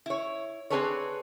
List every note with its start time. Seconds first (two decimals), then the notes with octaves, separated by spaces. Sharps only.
0.06 E4 C#5
0.70 C4 D4 G#4 A4 B4 C#5